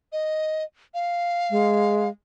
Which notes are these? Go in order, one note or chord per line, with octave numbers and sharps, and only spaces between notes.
D#5
F5
G#3